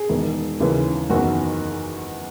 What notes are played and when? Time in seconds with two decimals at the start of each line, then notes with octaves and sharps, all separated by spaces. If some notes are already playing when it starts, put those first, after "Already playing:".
Already playing: G#4
0.09 E1 E2 D#3
0.60 D#2 C#3 E3
1.10 F#1 E2 D#3 F#4